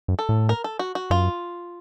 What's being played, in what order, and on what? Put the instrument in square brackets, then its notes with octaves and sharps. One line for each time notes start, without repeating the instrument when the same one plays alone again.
[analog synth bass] F#2
[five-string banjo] A4
[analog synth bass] A2
[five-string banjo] A#4
A4
F#4
F#4
[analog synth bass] F#2 [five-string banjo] F4